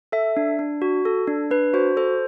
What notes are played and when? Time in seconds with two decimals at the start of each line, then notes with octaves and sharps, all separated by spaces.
0.12 A4 E5
0.37 D4
0.59 D4
0.82 F#4
1.05 A4
1.27 D4
1.51 D4 B4
1.74 F#4 C5
1.97 A4 C5